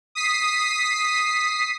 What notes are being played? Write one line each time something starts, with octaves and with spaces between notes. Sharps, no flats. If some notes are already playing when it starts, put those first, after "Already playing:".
D#6 B6 C7